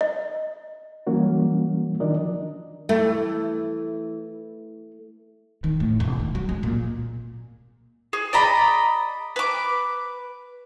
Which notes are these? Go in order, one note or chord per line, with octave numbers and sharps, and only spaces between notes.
D#5
E3 F#3 G3 A#3 C#4 F#4
D#3 F3 D4 A#4 D5 D#5
E3 A3
D#3
A2
E1
D#3
F#3
G#3
A#2
G#4
D5 D#5 A#5 B5
B4 D6